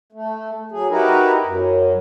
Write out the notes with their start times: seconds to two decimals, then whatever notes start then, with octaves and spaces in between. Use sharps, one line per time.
0.12 A3
0.71 F#3 G#4
0.90 D#4 E4 F#4 G4 A#4 B4
1.44 F#2